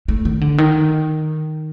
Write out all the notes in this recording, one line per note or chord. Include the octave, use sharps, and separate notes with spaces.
A3
D#3
D3
D#3